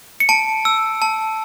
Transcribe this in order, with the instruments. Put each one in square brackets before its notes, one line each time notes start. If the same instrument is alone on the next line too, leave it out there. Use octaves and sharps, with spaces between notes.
[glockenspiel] C#7
A5 D7
E6
A5